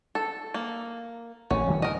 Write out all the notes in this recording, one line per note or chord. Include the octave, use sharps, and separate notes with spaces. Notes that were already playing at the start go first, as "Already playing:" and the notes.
A4
A#3
A1 C#4
D#3 F3 G3
A#4 D#5